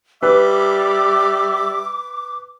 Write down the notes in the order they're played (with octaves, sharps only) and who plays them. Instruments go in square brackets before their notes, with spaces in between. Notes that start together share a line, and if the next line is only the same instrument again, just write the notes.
[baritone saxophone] G3 [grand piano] B4 [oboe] E5 [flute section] D6